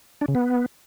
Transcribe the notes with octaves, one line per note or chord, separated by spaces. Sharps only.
D4
C#3
B3